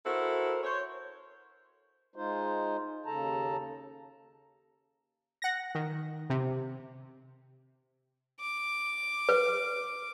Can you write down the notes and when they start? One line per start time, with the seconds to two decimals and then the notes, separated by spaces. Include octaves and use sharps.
0.06 E4 F#4 A4 A#4 C5
0.63 C5 C#5
2.16 G#3 D#4 F4 C5
3.06 D#2 C#3 A4 A5 A#5
5.42 F#5 A#6
5.75 D#3
6.30 C3
8.40 D6
9.29 B4